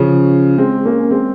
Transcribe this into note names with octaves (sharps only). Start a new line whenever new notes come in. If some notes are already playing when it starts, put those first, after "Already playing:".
Already playing: C#3 F3
G#3 C4
A#3 C#4
C#4
G#3 C4